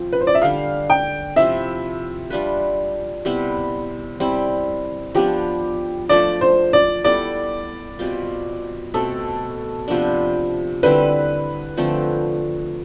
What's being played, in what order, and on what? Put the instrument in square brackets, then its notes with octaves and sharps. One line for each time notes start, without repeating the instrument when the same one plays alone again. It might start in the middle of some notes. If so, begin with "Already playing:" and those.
Already playing: [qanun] F3 C4
[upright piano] B4
C5
D5
E5
[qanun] D3 G3 D4 [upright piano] F5
[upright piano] G5
[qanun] C3 F3 C4 E4 [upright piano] E5
[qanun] G3 D4 F4 B4
C3 G3 B3 E4
G3 C4 E4
[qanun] F3 B3 D4 [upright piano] G4
[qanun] F3 A3 D4 [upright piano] D5
[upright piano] C5
D5
[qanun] G3 B3 E4 A4 [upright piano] D5
[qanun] B2 G3 C4 F4
[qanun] B2 A3 C4 [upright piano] A4
[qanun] C3 F3 B3 D4
[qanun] D3 G3 C4 E4 [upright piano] B4
[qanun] D3 F3 A3 C4